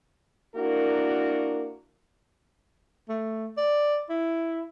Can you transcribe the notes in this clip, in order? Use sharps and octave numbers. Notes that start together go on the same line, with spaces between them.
A#3 D4 E4 F#4 A#4
A3
D5
E4